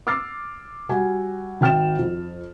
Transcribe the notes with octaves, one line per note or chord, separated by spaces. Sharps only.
D6 E6 F6 A6 C7
G3 F#4 G#5
G#1 G5 F6 A6 E7
F2